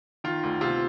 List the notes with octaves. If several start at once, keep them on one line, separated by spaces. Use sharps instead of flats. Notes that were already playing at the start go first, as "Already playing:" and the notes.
D#3 F4
D2
C3 F4